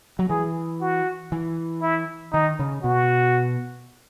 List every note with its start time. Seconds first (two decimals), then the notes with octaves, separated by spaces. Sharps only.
0.19 F#3
0.30 E3 G#4
0.81 F#4
1.32 E3
1.82 E4
2.33 D#3 D#4
2.59 C#3
2.84 B2 F#4